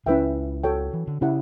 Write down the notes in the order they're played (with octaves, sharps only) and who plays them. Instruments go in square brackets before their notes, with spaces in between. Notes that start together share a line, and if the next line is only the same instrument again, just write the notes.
[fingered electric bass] C#2 C#3 [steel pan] C#4 E4 B4 E5 G5
[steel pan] F#4 A4 C#5 G5
[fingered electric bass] E3
D3
[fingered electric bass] C#3 [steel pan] C#4 E4 G4 C#5 F#5